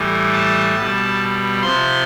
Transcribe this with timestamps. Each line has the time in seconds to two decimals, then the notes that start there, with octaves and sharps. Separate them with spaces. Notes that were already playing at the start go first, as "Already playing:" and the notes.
Already playing: A2 E3 G3
0.33 A5
0.76 B2 G3
1.62 C3 F3 C6